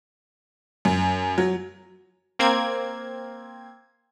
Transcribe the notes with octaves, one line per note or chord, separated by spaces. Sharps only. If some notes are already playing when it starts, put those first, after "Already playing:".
F#2
F#3
A#3 C4 G#6